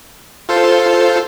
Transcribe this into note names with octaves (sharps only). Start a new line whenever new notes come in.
F4 A4 C5